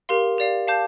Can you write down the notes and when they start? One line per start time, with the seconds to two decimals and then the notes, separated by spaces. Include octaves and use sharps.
0.09 G4 A#4 F5 C6
0.38 G4 D5 F5
0.67 F5 A5 D6 G6